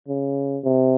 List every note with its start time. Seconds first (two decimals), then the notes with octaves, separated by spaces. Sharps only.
0.08 C#3
0.64 C3